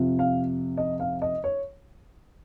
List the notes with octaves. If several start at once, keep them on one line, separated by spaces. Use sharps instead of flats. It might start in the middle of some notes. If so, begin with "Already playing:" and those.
Already playing: F2 C3 F3
F5
D#5
F5
D#5
C#5